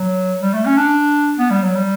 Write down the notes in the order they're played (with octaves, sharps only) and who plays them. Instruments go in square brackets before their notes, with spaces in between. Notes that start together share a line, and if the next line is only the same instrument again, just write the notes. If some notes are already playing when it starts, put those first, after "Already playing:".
Already playing: [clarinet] F#3
G3
A3
C#4
D4
B3
G3
F#3
G3